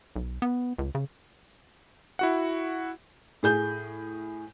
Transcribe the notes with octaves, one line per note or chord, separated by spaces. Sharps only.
B1
B3
C#2
C#3
E4 F#4 F#5
A2 G#4 G6